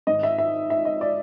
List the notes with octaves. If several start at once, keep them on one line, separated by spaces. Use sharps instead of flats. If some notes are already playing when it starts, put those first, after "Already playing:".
G#2 D#3 D#5
E5
E5
E5
D#5
D5